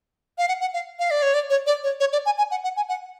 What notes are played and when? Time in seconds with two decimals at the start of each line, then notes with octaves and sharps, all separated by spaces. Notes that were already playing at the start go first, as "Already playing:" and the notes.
0.38 F5
0.48 F#5
0.61 F#5
0.74 F5
0.99 F5
1.11 D5
1.22 C#5
1.34 D5
1.50 C#5
1.66 D5
1.83 C#5
2.00 C#5
2.12 D5
2.26 G#5
2.38 G#5
2.51 F#5
2.64 F#5
2.76 G#5
2.89 F#5